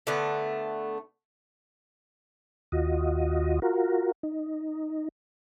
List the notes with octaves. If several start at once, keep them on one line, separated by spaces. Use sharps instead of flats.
D3 A3 B3
D#2 F4 F#4 D#5
F4 F#4 A#4
D#4